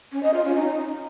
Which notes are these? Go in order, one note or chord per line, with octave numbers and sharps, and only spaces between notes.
C#4
D#5
F4
C#4
D#4